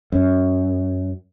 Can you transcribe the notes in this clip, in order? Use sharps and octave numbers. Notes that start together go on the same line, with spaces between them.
F#2